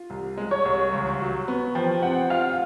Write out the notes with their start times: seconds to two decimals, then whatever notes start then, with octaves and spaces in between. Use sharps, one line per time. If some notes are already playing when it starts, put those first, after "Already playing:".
Already playing: F4
0.10 C2
0.37 G#3
0.51 C#5
0.65 C2
0.93 C#2
1.20 F#3
1.48 B3
1.75 F3 G5
2.02 C4 F#5
2.30 F4 F5